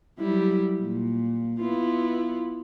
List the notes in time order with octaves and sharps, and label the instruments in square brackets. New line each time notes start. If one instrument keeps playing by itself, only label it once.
[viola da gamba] F#3 G3 E4
A#2
B3 E4 F4